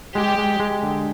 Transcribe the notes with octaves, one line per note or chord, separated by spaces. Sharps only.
G#3 G4
G#3
G#3
D3